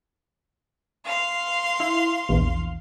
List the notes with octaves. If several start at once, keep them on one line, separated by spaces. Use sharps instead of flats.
F5 C6
E4
A#1 E2